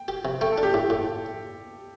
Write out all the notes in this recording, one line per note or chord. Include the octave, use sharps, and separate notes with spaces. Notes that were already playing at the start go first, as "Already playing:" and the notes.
Already playing: G5
G4
C3
A3 G5
A4
D4
G4
A2 G4
A2